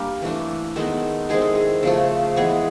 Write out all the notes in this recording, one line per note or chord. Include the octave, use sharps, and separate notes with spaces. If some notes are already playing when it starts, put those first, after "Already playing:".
Already playing: G3 A#3 D4 A#4
E3 A3 D4
D#3 G#3 B3 D#4 A4
D#3 G#3 C4 E4 G#4
A4
G#4
C#3 F3 A3 A4
E3 G#3 B3 G#4